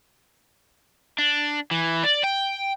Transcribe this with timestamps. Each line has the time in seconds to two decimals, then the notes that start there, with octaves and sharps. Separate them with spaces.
1.19 D4
1.71 E3
2.04 D5
2.24 G5